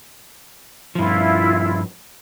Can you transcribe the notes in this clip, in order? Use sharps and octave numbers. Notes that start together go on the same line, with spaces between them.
G2 F3 E4 F4